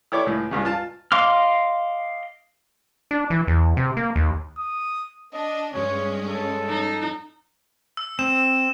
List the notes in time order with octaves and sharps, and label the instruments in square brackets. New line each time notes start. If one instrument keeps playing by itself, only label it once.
[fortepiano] E4 G4 A4 C#5 D5 D6
C#2 A2
C#2 G2 C#3
F4 A5
[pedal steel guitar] D#5 F5 C6 D6 F6
[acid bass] D4
E3
E2
C3
A#3
D#2
[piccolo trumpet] D#6
[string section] D4 [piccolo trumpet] D#5
[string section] G2 G#3 C#4 [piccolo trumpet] C#5
[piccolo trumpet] A4
[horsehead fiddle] D#4
[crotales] E6
[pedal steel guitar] C4 [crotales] E7